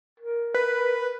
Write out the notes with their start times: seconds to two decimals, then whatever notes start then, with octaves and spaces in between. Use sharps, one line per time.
0.20 A#4
0.54 B4